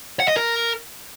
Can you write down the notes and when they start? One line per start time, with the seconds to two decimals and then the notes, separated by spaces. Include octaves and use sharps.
0.20 F#5
0.28 D#5
0.37 A#4